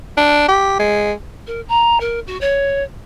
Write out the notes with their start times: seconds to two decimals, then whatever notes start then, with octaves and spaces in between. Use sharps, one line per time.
0.17 D4
0.49 G4
0.79 G#3
1.47 A#4
1.68 A#5
2.00 A#4
2.27 F#4
2.41 C#5